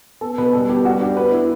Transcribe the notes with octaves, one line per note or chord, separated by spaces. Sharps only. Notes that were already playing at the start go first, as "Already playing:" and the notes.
B3 A4
B2 B4
G3 A4
B3 G4
G3 F#4
D4 G4
B3 B4
E4